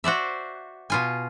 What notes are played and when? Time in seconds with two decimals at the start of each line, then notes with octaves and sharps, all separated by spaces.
0.04 F#4 C5 D5 E5
0.90 B2 F4 G#5